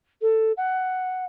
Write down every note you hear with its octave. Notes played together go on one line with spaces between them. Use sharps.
A4
F#5